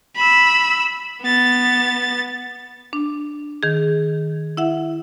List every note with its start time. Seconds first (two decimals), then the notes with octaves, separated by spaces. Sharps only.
0.16 B5 E6
1.22 B3 A6
2.93 D4
3.63 D#3 G#4
4.57 E4 E5 F#5